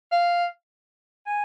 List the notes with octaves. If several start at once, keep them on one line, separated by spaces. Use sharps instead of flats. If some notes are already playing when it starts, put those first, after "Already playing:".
F5
G#5